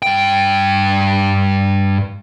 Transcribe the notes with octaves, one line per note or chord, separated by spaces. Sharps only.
G2 G5